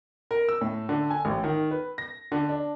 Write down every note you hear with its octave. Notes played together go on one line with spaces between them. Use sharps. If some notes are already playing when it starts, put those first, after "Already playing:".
A#4
E6
A2
D3
G#5
A1
D#3
B4
A#6
D3
D4